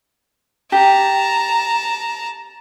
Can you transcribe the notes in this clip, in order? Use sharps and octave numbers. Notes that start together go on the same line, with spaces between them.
G4 A5 A#5